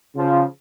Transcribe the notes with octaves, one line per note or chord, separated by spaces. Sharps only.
C#3 F3